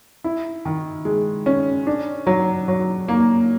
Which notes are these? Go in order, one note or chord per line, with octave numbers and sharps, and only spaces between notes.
E4
D#3
G#3
C#4
D4
F#3
F#3
A#3